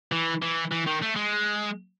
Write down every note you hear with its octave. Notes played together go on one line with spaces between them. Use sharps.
E3
E3
E3
D#3
A3
G#3